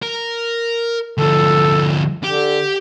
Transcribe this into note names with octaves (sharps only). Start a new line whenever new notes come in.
A#4
D2 F3 A4
D3 G4